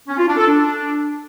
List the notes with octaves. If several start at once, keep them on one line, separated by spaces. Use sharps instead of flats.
C#4
F4
D4
A4
D4